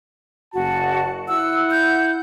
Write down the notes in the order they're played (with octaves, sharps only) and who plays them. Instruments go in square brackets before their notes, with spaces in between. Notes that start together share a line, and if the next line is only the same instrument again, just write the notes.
[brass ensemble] F#1 A5 [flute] F#4
[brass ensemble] E4 F#5 [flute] E6
[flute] G6